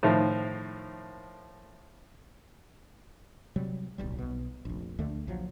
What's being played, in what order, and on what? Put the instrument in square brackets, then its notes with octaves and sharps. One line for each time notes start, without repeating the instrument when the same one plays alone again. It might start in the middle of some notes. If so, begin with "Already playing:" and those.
[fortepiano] A2 D#3 F3
[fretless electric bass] C3 F#3 G3
D1 B1 G3
B1 B2
F1 A#1
D2 D3 A3
A#1 F3 F#3